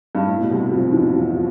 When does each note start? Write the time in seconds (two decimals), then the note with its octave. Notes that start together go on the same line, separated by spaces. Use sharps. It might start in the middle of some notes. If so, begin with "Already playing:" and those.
0.15 G2
0.27 A2
0.38 B2
0.51 C2 C3
0.71 F2 F3
0.92 E2 E3
1.13 F2 F3
1.34 F3